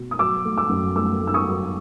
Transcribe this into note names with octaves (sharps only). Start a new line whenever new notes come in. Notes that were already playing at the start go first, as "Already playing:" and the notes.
Already playing: B2
D#6
F#3 D6 E6
A3
D6 E6
F#2
A3 D6 E6
A3
E6
C#6 D#6
F#3